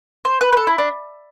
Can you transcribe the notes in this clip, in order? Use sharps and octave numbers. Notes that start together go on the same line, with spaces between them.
C5
B4
B4
A4
E4
D4